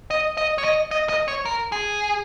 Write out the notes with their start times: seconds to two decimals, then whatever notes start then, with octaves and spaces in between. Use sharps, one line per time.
0.11 D#5
0.37 D#5
0.58 C#5
0.64 D#5
0.91 D#5
1.09 D#5
1.28 C#5
1.45 A#4
1.72 G#4